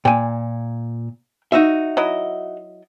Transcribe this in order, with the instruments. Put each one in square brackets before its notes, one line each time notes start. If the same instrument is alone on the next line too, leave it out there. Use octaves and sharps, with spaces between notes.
[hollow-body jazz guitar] A#2 [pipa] G5 G#5
[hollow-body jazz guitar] D#4 F#4 E5
[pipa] F#3 E4 D#5